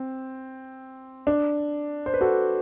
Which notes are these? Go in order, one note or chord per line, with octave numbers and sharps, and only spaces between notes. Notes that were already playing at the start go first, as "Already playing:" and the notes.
Already playing: C4
D4
C5
B4
F#4 A4